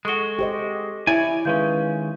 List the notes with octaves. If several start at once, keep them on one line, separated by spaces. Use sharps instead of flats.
G#3 F#4 A4 C#6 G7
G4 C5 D#5
E4 C#5 D5 G#5
D#3 G#3 C#4 B4 F5 G6